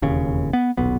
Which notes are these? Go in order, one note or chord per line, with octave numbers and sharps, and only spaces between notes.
E1 D#2 C#3
B3
D#1 B1 B3